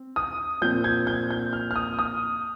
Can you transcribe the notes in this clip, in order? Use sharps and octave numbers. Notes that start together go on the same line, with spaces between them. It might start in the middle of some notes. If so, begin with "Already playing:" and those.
Already playing: C4
D#6
A#2 F3 C4 G6
G#6
G6
G6
F6
F6
D#6
D#6